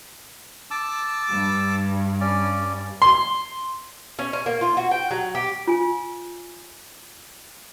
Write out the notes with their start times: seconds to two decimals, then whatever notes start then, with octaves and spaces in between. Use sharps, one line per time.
0.71 A5 D6 E6
1.30 G2
2.20 C#4 D5
3.02 C6
4.19 C#4
4.33 C#4
4.46 A#3
4.61 F4
4.77 F#4
4.91 G5
5.11 F#3
5.35 G4
5.68 F4 G#5